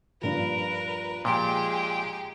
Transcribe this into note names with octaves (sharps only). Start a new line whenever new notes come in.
G2 A#2 F3 A#4 B4
A#2 F3 G#3 G4 G#4 G5